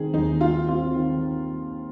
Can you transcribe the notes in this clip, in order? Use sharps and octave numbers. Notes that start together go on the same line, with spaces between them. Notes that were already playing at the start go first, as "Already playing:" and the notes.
Already playing: D#3 G#3 C4 G#4
D#2 D#4
G#3 F4
C4 F4
D#3